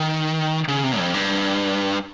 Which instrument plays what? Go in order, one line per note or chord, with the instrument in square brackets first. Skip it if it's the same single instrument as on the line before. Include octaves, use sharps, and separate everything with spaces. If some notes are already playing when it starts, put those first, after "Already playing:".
Already playing: [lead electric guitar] D#3
C#3
C3
F2
G2